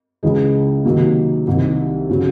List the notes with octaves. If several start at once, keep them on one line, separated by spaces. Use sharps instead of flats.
C#2 C#3 E3 G#3
C3 D#3 F#3 A#3
C2 C3 D#3
C#3 F#3